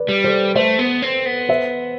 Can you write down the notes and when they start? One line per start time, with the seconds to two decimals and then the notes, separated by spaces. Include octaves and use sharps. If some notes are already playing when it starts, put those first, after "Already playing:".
Already playing: B4 D5
0.09 G3
0.24 A4 C5
0.55 A3 C5 E5
0.79 B3
1.02 C4
1.26 B3
1.49 C5 E5